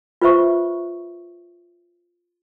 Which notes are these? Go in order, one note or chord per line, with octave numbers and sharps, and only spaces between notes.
F4 B4 C5 E5 C#6